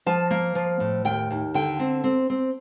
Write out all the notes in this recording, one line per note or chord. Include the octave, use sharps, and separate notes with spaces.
F3 A5
A#3
F3
A2
D#2 G5
D#2
D3 G5
C4
C4
C4